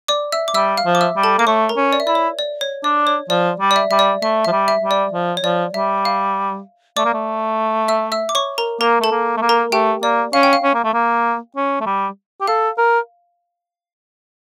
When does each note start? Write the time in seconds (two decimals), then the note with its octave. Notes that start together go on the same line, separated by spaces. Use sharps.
0.08 D5 D6
0.32 E5 E6
0.48 D6
0.54 G3 E5 E6
0.77 F5 F6
0.86 F3
0.95 D6
1.01 E5 E6
1.17 G3
1.24 A4 A5
1.39 A#3 D6
1.47 A3 C#5 C#6
1.69 A#4 A#5
1.77 C#4
1.93 D5
2.00 E5
2.07 E4 D5
2.15 C#5
2.39 D5
2.61 C#5
2.84 D4 D5
3.07 C#5
3.30 F3 D5
3.60 G3
3.71 D5
3.76 E5
3.91 G3 E5
3.99 D5
4.22 A3 E5
4.45 F3 E5
4.52 G3
4.68 E5
4.84 G3
4.91 D5
5.13 F3
5.37 C#5
5.44 F3 D5
5.74 G3 E5
6.05 F5
6.96 A3 D5 D6
7.05 A#3
7.14 A3
7.88 E5 E6
8.12 E5 E6
8.29 D6
8.35 C#5 C#6
8.58 A#4 A#5
8.81 A#3 A#4 A#5
9.00 A3 A4 A5
9.11 A#3
9.37 A3
9.42 A#3
9.49 A#4 A#5
9.72 A3 G4 G5
10.03 A#3 D5
10.33 C#4 F5
10.43 G5
10.53 F5
10.63 C#4
10.74 A#3
10.84 A3
10.94 A#3
11.56 C#4
11.80 A3
11.86 G3
12.41 G4
12.47 A4 F5
12.78 A#4